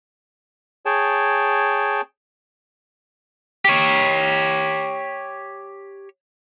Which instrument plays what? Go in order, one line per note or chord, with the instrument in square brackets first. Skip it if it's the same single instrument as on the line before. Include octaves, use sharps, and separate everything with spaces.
[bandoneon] G#4 C#5 G5 A5
[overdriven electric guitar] G4 C#5